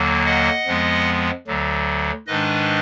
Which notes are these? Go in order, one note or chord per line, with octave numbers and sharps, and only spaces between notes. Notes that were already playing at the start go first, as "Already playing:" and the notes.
Already playing: D#2 D3 F#3 A#3
D#5 F#5
F2 F3 G#3 B3
D2 D3 F#3
G#2 D#3 G#3 D4 B4 D#5